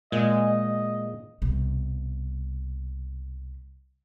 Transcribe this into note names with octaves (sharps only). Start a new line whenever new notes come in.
A#2 G#3 D#5
C2 B2